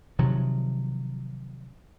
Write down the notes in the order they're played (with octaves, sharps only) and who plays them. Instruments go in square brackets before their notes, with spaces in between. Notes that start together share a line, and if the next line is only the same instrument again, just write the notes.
[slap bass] C3 D#3 F3 F#3